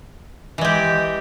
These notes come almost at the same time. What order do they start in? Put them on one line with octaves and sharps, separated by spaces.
E3 G#3 G4